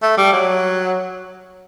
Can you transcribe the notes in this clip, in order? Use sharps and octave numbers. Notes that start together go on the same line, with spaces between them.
A3
G3
F#3